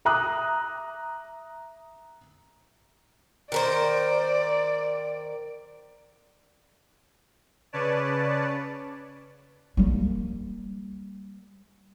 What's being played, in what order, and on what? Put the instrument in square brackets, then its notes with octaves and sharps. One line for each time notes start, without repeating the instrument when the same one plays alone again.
[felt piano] E5 A#5 D6 D#6 F#6
[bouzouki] D#3 A#4 C5 [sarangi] D5
[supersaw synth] C#3 B4 C#5 D5 A5
[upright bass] G3 A#3